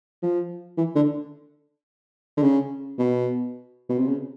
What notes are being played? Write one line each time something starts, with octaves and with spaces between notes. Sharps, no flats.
F3
E3
D3
D3
C#3
B2
B2
C3
C#3